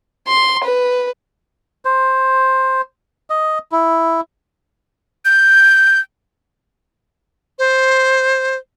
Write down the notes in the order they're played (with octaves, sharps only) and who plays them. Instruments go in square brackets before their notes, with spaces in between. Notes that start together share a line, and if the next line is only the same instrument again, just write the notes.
[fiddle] C6
B4
[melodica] C5
D#5
E4
[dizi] G6
C5